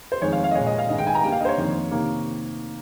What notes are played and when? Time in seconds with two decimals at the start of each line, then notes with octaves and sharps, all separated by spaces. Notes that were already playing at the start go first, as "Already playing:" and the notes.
0.12 C5
0.22 F2 D#3 G#3 C#5
0.32 F5
0.44 F5
0.51 D#5
0.55 A#2 G#3 C#5
0.66 D#5
0.79 F5
0.89 G#2 D#3 G#3 D#5
0.98 G5
1.07 G#5
1.15 A#5
1.23 G2 G3 A#3 G5
1.32 F5
1.40 D#5
1.45 C5
1.49 C#5
1.57 F2 D#3 A#3
1.91 C3 D#3 A#3